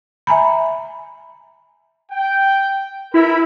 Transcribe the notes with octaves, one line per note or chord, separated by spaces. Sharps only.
E5 G#5 A#5 B5
G5
E4 A#4 B4 B5